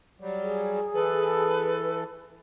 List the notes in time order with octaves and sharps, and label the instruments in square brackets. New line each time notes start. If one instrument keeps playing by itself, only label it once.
[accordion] F#3 G3
[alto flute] G#4
[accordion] E3 A4 [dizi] B4